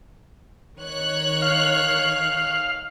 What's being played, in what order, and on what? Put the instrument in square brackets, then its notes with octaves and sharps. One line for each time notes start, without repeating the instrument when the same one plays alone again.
[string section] D#3 C#5 F#6
[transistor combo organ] F5